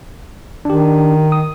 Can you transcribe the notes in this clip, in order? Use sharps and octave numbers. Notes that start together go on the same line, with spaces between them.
D#3 D4 G4
D#6